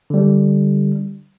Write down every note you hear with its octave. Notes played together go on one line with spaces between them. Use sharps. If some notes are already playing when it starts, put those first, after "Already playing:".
D3 G3